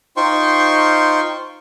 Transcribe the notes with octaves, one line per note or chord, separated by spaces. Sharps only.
D#4 F4 C5 G5 C6 C#6